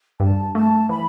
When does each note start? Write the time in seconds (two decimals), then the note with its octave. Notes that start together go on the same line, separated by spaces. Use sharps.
0.20 G2 A5
0.55 A3 A5
0.89 E3 B5